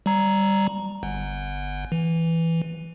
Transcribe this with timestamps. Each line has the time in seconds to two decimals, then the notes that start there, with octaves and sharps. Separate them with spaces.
0.06 G3 A#5
1.03 G1
1.92 E3